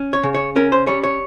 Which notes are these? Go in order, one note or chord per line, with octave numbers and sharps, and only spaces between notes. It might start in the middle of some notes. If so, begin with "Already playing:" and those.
Already playing: C#4
C#5
C#3
C#5
C#4 A#4
C5
G3 C#5
C#5